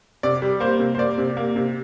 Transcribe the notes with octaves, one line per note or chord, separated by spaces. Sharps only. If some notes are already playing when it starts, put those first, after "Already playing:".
C3 D5
G3
A#3 C5
C3
C5
A#3 D5
C3
A#3
C3